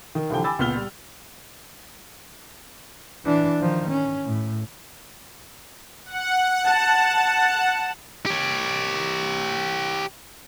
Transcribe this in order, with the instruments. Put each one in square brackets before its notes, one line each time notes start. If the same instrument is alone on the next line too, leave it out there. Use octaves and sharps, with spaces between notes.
[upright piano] D#3
C2 D3 E3 F3 G5
G5 G#5 B5 D6 E6 A6
C#2 A#2 B3 F6 F7 G7
G3
[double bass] E3 D4
D#3 F3
C#4
A2
[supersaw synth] F#5
[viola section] A5
[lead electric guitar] G4 C#5